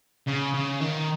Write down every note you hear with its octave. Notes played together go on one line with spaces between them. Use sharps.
C#3
C#3
D#3